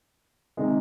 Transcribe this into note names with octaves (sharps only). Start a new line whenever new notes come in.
C3 D#3 G#3